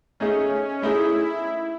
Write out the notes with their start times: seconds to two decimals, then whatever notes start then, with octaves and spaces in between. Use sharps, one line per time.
0.20 A3 C#4 D#4 G#4 D#5
0.82 A3 D#4 E4 G#4 D#5